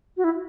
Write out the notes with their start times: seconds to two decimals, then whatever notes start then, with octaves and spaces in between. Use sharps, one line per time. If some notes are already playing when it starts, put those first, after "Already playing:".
0.17 F#4
0.24 E4